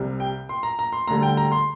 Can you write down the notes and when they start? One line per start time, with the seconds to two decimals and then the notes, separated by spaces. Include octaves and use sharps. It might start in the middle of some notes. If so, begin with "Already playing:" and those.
Already playing: C2 C3 G3
0.20 G5
0.49 C6
0.63 A#5
0.79 A#5
0.93 C6
1.07 D2 D3 G3 A#5
1.23 G5
1.37 A#5
1.52 C6